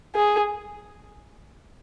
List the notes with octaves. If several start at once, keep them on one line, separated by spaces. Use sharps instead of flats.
G#4